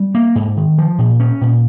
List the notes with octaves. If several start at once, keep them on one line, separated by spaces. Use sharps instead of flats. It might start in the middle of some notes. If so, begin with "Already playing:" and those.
Already playing: G3
A#3
G#2
D#3
F3
A#2
C#4
A#2